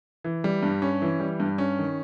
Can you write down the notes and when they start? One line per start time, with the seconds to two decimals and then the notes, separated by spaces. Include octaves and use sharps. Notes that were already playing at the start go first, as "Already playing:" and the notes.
0.24 E3
0.44 G3
0.63 G2
0.82 C#4
1.02 E3
1.20 G3
1.40 G2
1.58 C#4
1.79 D#3